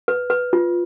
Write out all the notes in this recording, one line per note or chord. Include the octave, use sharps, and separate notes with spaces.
B4
B4
F4